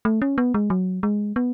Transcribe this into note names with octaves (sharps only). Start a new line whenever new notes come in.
A3
C#4
B3
G#3
F#3
G#3
B3